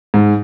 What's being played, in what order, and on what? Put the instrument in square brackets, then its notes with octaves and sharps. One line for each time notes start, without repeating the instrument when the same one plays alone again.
[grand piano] G#2